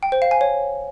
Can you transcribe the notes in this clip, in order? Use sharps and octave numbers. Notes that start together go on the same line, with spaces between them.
G5
C5
F5
G#5
C#5